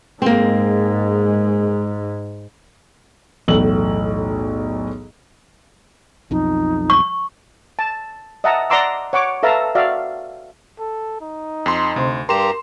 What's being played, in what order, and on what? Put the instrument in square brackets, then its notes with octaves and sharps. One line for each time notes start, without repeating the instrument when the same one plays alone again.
[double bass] G#2 [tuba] G#3 [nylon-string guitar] A#3 C4
[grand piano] B1 E2 A2 E6 F#7
[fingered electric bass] B1 F2 [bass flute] D#4
[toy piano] C#6
[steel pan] A5
D#5 E5 F#5 A5 A#5
D5 F#5 A#5 C6 D6 E6
C#5 F#5 C#6 D6
A4 B4 E5 F5 A5 A#5
F#4 D5 E5 F5
[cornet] A4
D#4
[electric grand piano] F2 C6
[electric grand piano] D2 [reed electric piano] C3 C5 C6
[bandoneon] G2 G4 A#5 [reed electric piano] A#4 [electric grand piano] C6 E7